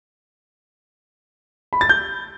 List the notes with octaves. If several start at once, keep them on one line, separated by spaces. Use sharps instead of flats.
B5
A6
G6